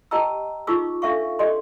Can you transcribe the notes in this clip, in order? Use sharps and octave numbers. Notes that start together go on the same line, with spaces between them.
G4 D#5 G5 A5 A#5 E6
D#4 F4 G#4 C#6 D6 E6
D4 A4 E5 F5 C#6
G4 A4 D5 D#5 C6